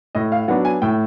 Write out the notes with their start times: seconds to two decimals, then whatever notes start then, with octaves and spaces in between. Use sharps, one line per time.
0.15 A2 D#5
0.32 F5
0.48 F#3 B3 D4 F#5
0.65 G#5
0.82 A2 G5